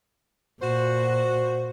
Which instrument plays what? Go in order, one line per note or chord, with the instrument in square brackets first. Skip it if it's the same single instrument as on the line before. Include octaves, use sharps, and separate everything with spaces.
[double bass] A#2 [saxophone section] F#4 C5